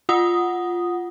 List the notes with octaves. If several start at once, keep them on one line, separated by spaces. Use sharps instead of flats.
F4 F#5 D#6